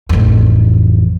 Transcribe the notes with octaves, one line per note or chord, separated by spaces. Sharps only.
A1 F2